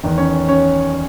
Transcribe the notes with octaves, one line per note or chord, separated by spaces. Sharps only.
E2 D#3
C#4 C#5
C#4 C#5